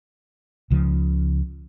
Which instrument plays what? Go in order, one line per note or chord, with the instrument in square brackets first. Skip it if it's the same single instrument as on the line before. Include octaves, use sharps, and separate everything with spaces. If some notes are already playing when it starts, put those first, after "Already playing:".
[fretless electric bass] C#2 C#3 F3